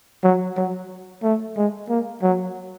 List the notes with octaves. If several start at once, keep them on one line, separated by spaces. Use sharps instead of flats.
F#3
F#3
A3
G#3
A#3
F#3